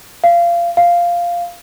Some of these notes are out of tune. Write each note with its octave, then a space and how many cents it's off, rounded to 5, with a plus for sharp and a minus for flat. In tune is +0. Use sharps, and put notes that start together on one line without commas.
F5 -25
F5 -5